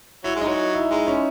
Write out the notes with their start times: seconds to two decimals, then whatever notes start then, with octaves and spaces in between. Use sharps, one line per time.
0.24 F#3 E4
0.35 G#3
0.41 D#4
0.47 F#3
0.74 E4
0.90 G#3 D#4
1.07 C#4